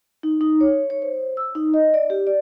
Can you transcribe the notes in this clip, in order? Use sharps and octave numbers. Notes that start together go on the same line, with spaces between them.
D#4
D#4
C#5
C#5
C5
E6
D#4
D#5
D5
G4
D5